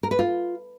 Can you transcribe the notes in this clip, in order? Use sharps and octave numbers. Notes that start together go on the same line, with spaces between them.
A#4
B4
F4